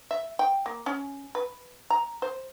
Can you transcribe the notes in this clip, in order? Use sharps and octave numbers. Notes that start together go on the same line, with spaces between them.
E5
G5
A#3
C#4
B4
A#5
C5